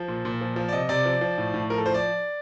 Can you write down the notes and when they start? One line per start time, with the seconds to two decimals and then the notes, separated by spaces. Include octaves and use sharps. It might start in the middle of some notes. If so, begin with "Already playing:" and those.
Already playing: F3
0.08 A#2
0.25 A#2
0.41 F3
0.56 F3
0.68 D5
0.73 C3 D#5
0.89 C3 D5
1.05 F3
1.21 F3
1.38 A2
1.54 A2
1.70 F3 A#4
1.78 A4
1.86 F3 C5
1.94 D5